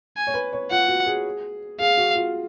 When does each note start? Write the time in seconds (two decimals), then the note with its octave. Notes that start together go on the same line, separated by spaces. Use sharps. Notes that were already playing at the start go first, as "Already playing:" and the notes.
0.17 G#5
0.27 C#5
0.34 B4
0.53 C#5
0.71 F4 F#5
0.88 F#4
1.06 G#4
1.80 G#4 F5
1.98 F#4
2.15 F4